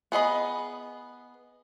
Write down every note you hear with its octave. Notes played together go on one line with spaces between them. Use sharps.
B3 G#4 D#5 B5